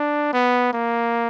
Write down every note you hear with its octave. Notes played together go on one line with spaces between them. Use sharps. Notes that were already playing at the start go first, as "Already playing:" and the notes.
Already playing: D4
B3
A#3